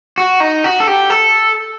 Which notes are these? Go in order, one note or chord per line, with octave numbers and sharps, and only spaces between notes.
F#4
D#4
F#4
A4
G4
A4